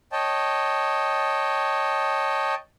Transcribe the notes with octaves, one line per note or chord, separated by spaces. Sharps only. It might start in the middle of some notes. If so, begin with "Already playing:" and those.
C#5 D#5 G5 A5